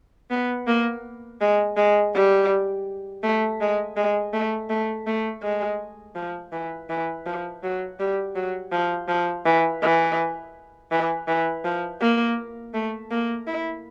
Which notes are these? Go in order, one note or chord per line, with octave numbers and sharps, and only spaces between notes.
B3
A#3
G#3
G#3
G3
A3
G#3
G#3
A3
A3
A3
G#3
F3
E3
E3
F3
F#3
G3
F#3
F3
F3
E3
E3
E3
E3
F3
A#3
A3
A#3
E4